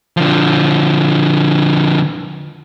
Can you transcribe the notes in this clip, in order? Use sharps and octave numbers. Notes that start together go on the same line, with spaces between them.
D3 F3